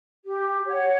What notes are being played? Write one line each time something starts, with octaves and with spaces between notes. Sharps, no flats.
G4
C#5 F#5